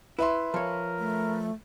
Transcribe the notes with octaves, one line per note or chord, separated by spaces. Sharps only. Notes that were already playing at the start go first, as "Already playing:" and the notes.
E4 B4 E5 C6
F3 A#4 C#5
A3